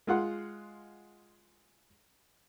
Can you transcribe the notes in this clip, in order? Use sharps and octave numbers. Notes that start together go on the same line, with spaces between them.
G#3 F4 F#5 C6